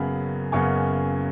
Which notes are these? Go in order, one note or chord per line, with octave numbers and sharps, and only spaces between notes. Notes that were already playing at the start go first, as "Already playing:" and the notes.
Already playing: F#1 F#2 C#3 B3 B5
F#1 F#2 C#3 B3 G#5 C#6